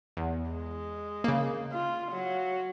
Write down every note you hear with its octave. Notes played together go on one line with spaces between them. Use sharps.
E2
G#3
C#3 A#3
F4
F#3